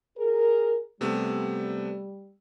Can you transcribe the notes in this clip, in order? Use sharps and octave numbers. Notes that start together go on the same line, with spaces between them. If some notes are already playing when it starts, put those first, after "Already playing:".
G#4 A#4
C3 G3 A3 B3